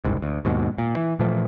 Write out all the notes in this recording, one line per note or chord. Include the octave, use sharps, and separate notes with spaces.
F#1 C2 G#2
D2
D#2 G#2 B2
A#2
E3
A#2 E3 F3 A3